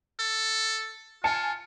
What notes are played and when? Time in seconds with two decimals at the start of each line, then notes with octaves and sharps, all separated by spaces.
0.19 A4
1.24 F4 G#5 A5 C#7